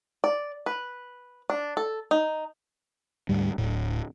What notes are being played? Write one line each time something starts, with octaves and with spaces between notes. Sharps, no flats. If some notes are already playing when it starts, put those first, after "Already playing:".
D5
B4
D4
A4
D#4
D2 G#2 G3
D1 A2